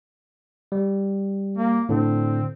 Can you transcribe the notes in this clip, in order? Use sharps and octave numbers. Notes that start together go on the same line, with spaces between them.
G3
A#3
A2 D3 C4